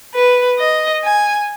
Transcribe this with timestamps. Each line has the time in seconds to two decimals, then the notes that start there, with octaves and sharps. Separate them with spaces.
0.15 B4
0.59 D#5
1.04 G#5